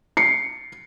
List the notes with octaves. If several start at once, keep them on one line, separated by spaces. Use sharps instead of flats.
C7 C#7